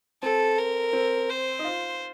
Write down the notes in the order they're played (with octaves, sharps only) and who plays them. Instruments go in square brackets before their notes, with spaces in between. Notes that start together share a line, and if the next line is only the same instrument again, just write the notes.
[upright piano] C4 [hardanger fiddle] A4
[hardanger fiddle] A#4
[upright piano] C4
[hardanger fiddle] C5
[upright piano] D#4
F4